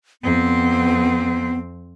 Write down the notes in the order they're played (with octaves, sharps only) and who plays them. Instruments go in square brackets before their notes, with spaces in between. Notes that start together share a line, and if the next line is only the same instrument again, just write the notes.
[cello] F2 C4 [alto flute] B3